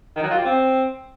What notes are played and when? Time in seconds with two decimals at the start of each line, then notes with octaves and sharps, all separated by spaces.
0.16 D#3
0.23 F#3
0.31 F4
0.38 G4
0.45 C4